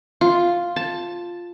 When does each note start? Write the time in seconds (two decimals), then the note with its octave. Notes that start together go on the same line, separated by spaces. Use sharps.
0.21 F4
0.76 A5